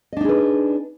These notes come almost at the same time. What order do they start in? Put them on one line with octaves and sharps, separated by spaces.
D#5 D4 D#4 G#4 B4